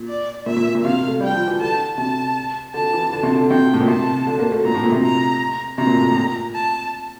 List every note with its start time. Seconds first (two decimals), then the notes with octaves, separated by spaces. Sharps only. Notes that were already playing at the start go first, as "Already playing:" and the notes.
Already playing: A#2
0.08 D5
0.46 A#2 E5
0.57 A#2
0.75 A#2
0.84 C3 F5
1.07 A3
1.20 G3 G5
1.34 F3
1.47 E3
1.60 D3 A5
1.98 C3 A5
2.74 D3 A5
2.93 E3
3.13 D3
3.23 C3
3.36 D3
3.50 C3 G5
3.74 A2
3.80 A#2
3.88 C3 A5
4.27 D3
4.39 A#3
4.52 A3
4.65 A#2 A#5
4.74 A2
4.84 A#2
4.92 C3
5.03 A#5
5.78 C3 A#5
5.87 A#2
5.97 A2
6.12 A2
6.16 A#2
6.54 A5